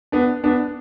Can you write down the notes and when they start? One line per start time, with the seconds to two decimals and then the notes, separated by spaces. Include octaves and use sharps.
0.12 B3 D4
0.44 B3 D4